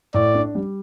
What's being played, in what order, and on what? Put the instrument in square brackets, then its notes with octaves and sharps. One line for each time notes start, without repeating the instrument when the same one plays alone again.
[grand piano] A2 [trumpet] D5
[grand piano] D4
G3